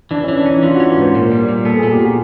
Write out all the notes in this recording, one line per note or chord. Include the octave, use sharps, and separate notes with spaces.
E3 D4
C#4
E3
D4
C#4 D#4
E3 F4
F#4
C#4
B4
G#2 C5
A#2 A#4
G3
A#2
B3 A4
G#4
A#2
G4
A#2 F#4